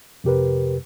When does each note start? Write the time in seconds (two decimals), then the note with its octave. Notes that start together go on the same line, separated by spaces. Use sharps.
0.24 F2 C3 G4 A#4 B4